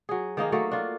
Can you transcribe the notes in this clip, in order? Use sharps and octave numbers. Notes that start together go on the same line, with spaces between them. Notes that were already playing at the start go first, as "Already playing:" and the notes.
F#3 G#4
D#3 A#3 D#4 G#4
F#3 A3 A#3 A4
D4 F4